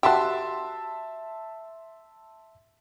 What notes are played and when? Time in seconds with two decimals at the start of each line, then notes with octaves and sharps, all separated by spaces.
0.03 F#4 G4 E5 A5 C6